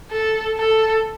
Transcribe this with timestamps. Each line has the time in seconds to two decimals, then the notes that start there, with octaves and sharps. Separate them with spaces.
0.11 A4
0.58 A4